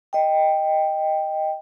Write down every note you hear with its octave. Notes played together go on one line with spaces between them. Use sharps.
D#5 G5